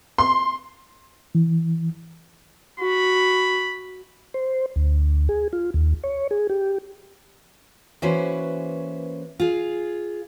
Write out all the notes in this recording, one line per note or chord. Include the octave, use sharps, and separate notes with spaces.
C6
E3
F#4 B5
C5
D2
G#4
F4
D#2
C#5
G#4
G4
E3 A#3 C#4 F#4 B4 C5
F4 G#4